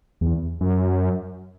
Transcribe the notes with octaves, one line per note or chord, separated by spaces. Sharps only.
E2
F#2